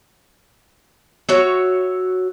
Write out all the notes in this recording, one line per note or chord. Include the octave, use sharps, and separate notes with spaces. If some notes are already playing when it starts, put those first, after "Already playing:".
F#4 C#5 E5